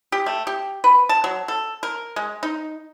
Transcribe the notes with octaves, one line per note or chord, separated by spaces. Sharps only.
G4
A3
G4
B4
A5
F#3
A4
A#4
G#3
D#4